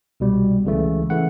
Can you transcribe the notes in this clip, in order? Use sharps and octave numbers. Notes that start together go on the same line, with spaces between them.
C2 B2 G3
C#2 C#3 E3 A3
C#3 E3 A3 F#5